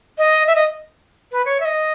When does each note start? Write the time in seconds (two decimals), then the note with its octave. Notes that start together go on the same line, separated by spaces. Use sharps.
0.18 D#5
0.47 E5
0.55 D#5
1.32 B4
1.45 C#5
1.60 E5
1.65 D#5